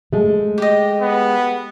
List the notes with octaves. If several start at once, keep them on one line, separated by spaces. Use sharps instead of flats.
G#3 A3
G4 D#5
B3